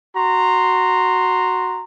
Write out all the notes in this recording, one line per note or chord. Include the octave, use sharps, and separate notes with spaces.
F#4 A#5 C6